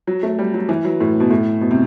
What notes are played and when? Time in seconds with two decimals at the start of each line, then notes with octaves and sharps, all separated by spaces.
0.07 F#3
0.23 A3
0.39 G3
0.54 F#3
0.69 E3
0.85 F#3
1.01 A2
1.20 B2
1.31 A2
1.61 B2
1.71 C3